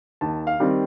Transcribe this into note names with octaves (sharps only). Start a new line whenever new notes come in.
D#2 A5
F5
D#3 G3 C4